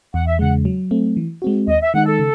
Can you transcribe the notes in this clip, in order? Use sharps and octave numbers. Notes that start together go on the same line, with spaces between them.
E2 F#5
E5
C#3 G#3 F#5
F#3
A3 C4
E3
G#3 C4 F#4
D#2 D#5
E5
D#3 G#3 D#4 F#5
A4
C#3